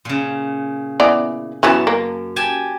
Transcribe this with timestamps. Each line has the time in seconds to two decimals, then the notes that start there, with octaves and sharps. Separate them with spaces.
0.05 A#2 C#3
1.00 E3 B3 D5
1.63 F#2 E3 F#3 B3 A5
1.87 A#3
2.36 G4 G#5 A5